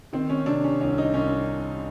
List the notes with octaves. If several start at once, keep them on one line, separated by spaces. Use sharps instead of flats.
D#3 C4
C#4
C3 D4
C#4
C2 C#4
D#4
C2 C#4